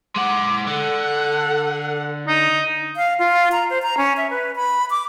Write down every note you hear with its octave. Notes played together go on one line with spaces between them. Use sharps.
G#3 F#5 D6
D3 A4 F#5
D#4
F5
F4
A#5
C5
A#5
C#4
E5
B4
B5
D6